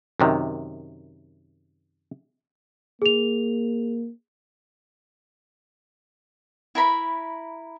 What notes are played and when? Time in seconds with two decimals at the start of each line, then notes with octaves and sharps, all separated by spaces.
0.20 F#2 C3 D#3
3.02 A#3 G#4 F7
6.75 E4 A#4 B5